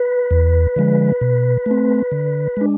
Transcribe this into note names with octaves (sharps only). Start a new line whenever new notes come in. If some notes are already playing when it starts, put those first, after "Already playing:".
Already playing: B4
E2
D3 F3 G#3
B2
A3 C4
D3
G#3 D4